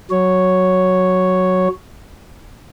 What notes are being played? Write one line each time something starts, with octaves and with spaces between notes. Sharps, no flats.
F#3 C#5